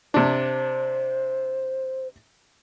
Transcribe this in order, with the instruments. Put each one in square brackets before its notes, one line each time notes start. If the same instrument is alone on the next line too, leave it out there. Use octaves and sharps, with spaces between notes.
[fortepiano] C3 D4 [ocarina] C5